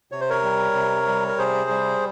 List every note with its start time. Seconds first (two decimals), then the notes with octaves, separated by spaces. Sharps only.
0.12 C3 C#5
0.21 C5
0.30 A#4 C#5
0.43 G3
0.75 C3
1.07 G3
1.28 A#4
1.38 C3 G#4 C5
1.70 G3